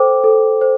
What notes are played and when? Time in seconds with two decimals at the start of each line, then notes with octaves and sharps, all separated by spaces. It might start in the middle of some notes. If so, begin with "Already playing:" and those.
Already playing: A4 C5 G5 D6
0.24 A4
0.61 C5